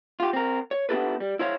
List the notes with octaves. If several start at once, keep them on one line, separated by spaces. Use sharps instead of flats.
F4 G4
C4 A#4
C#5
B3 D4 E4 G4 A4 B4
G3
E4 C5 C#5 F5